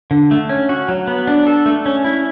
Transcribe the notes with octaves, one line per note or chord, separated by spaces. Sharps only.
D3
A3
C#4
F#4
F#3
B3
D4
A4
A3
C#4
E4